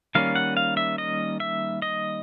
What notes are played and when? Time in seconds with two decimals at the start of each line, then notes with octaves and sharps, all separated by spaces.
0.15 D#3 G3 A#3 C#4 F5
0.35 F#5
0.57 F5
0.77 E5
0.98 D#5
1.40 E5
1.82 D#5